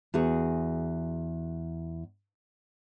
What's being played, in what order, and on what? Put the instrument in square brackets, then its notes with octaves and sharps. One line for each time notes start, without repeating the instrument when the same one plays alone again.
[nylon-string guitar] E2 F#4 G#4